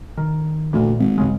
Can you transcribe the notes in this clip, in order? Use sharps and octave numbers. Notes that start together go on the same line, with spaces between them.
D#3
D2 A#2 E3
G#1
G2 C#3 G#3